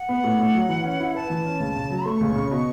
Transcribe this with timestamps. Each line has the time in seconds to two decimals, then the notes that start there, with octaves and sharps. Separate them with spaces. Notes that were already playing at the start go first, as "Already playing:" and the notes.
Already playing: F#5
0.09 B3
0.24 A2
0.39 A2
0.54 F#3
0.69 E3
0.84 C#4
1.00 E4
1.15 B4 A5
1.30 E3
1.45 C#4
1.60 C#2
1.76 C#3
1.90 F#3
2.05 A3 C#6
2.21 C#2
2.35 C#3
2.51 B2